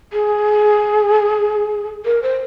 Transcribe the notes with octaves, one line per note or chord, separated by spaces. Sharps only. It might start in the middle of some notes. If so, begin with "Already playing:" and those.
G#4
A#4
C5